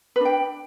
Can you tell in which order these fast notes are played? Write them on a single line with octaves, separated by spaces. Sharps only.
B4 D4 G5